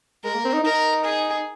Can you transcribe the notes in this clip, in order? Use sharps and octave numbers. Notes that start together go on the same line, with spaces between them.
G#3 A#4
A#3
C4
D#4
D#4 A#4
G#4